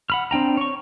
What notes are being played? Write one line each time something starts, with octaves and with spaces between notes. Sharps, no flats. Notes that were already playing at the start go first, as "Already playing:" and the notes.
F#5 B5 F6
C4 D4 G5 A#5
C#5 C#6